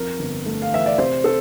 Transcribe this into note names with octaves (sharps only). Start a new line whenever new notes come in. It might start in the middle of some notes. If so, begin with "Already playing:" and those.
Already playing: F2 A#4
G1
A3
F5
E3 E5
D5
C3 C5
A4